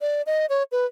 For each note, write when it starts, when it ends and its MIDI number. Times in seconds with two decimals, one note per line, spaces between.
0.01 0.22 74
0.26 0.46 75
0.50 0.63 73
0.72 0.86 71